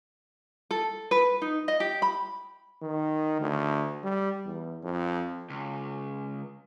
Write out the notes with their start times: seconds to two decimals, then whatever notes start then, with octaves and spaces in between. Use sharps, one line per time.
0.71 A4
1.11 B4
1.42 D#4
1.68 D#5
1.80 G4
2.02 B5
2.82 D#3
3.40 D2
4.03 G3
4.45 E2
4.83 F2
5.50 C#2